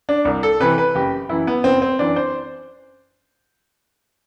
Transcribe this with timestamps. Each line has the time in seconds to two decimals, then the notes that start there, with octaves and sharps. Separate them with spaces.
0.09 D4
0.25 C2
0.43 A4
0.60 C3 E3 B4
0.78 B4
0.95 F#1 G4
1.29 F#2 E3 E4
1.47 B3
1.64 F#1 C4
1.82 C4
1.99 F#2 E3 D4
2.16 C5